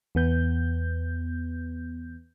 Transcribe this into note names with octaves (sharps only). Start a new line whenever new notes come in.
E2 B3 G6